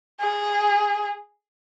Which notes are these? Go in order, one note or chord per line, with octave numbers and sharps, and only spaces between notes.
G#4